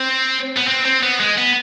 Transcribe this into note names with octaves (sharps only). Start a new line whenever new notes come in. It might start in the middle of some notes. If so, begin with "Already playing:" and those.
Already playing: C4
B3
C4
C4
B3
G#3
B3